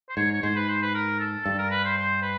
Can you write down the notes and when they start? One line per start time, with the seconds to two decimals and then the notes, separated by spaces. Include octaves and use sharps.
0.09 C5
0.17 G#2 C#5
0.32 C#5
0.42 G#2 C5
0.56 B4
0.68 C5
0.82 B4
0.94 A#4
1.19 A4
1.45 G2 A4
1.58 A#4
1.71 B4
1.84 C5
1.97 C5
2.22 B4